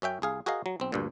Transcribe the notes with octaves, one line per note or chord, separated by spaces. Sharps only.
F#2 C#4 E5 G5
C2 G#4 F5
F#4 G#4 A#4 D#5 F5
F#3
B1 C4
D2 G2 A#2